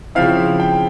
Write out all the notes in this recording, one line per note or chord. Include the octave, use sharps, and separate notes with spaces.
C#3 F3 C4 E4 F5
G5